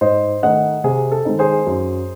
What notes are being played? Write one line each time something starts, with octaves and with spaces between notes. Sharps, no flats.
G#2 C5 D#5
D#3 A3 D#4 D#5 F#5
C3 G#4
A4
D#3 G#3 C4 D#4
G#4 C5
F#2